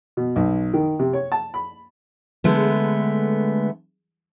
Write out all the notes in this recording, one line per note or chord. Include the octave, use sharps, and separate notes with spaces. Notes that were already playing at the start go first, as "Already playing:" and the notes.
B2
B1
D#3
C3
C#5
A5
B5
D3 G#3 A3 B3